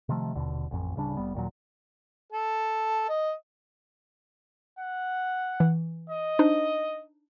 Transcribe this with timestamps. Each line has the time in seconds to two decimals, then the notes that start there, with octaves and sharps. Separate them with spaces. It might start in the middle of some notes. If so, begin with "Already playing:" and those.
0.09 C3 D#3 F3 A3
0.35 D#1 D#2 B2 D3
0.71 A1 F2
0.96 D1 C#3 G3 D4
1.17 F1 G3 B3
1.34 D#2 A#2 F#3
2.32 A4
3.08 D#5
4.79 F#5
5.60 E3
6.10 D#5
6.39 D4 D#4 C5